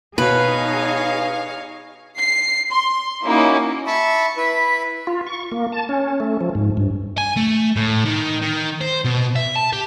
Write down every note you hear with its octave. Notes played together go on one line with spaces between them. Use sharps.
B2 D#4 G#4 B4 C#5 D#5 F5
C7
C6
A#3 C#4 D#4 E4 F#4
E5 A5 B5 C#6
E4 B4 E5
F4
C#6
A#3
A5
C#4
A3
F3
G#2
G2
G#5
A3
A2
D#3
D#3
C5
B2
E5
A5
G4